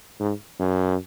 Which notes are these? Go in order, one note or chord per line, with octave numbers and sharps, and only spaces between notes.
G#2
F#2